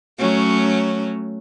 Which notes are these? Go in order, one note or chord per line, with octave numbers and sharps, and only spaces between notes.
F#3 A3 C#4